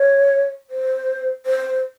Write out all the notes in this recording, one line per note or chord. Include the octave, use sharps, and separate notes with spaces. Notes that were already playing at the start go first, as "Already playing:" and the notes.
Already playing: C#5
C5
C5